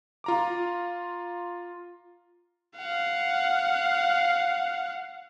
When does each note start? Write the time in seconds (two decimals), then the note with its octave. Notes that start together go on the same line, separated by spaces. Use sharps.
0.24 F4 A#5 D6
2.77 F5 F#5